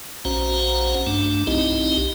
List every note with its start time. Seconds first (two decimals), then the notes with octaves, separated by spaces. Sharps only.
0.25 A#1 C#4 F#4 C5 F#5 A#5
1.06 G2 A3 D4
1.47 B1 C4 D#4 E4 G4 D#5